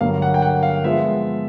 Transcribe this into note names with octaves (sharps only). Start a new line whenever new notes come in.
G2 D3 F#3 A#3 F5
F#5
G5
F#5
F5
F3 G#3 B3 E5